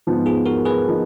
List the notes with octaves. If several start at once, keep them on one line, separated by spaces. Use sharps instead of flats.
G#2 F3 B3
F4 G#4
F#4 A#4
G#4 B4
F3 B3 D#4